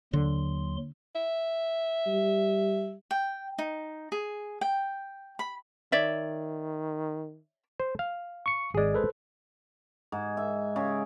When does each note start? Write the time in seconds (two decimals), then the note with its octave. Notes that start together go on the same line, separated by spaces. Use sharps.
0.13 D#2 D3 F#3 C6
1.15 E5
2.07 G3
3.11 G5
3.58 D#4
4.12 G#4
4.61 G5
5.39 B5
5.92 D#3 C#5 D5 E5
7.80 C5
7.99 F5
8.46 C#6 C#7
8.75 G#1 G#3 G#4 D5
8.94 A4 B4 C5
10.12 G#2
10.37 E5
10.76 C#3